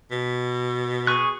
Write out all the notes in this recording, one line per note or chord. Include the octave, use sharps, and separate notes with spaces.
B2
G#4 C#6 F#6